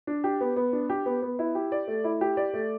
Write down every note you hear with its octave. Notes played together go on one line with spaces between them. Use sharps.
D4
G4
B3
B3
D4
G4
B3
B3
E4
G4
D5
A3
E4
G4
D5
A3